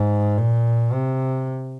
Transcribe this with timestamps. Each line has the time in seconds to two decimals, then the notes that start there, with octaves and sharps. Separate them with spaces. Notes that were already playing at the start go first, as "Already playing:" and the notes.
Already playing: G#2
0.38 A#2
0.93 C3